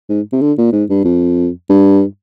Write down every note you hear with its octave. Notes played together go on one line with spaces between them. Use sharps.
G#2
C3
D3
A#2
G#2
G2
F2
G2